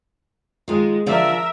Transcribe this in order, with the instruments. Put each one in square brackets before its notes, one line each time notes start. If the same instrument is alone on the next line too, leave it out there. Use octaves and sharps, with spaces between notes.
[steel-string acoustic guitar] D#3 F4 [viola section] G#3
[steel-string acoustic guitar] D3 F3 D5 [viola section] A#4 E5